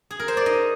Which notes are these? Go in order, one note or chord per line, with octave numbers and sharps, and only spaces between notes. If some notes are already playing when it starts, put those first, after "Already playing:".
G#4
A#4
C5
D5
D#4 D#5